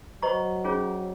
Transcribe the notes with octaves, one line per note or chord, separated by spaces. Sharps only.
F#3 C5 D#5 A#5 C#6
C#4 F4 G#4 C#5